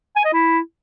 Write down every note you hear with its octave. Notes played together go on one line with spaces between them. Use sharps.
G#5
D#5
E4